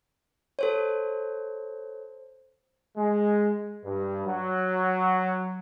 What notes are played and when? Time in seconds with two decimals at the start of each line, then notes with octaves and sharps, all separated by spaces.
0.59 A4 C5 C#5
2.97 G#3
3.84 G2
4.27 F#3